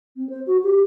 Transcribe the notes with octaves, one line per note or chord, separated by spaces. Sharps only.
C4
C5
F#4
G4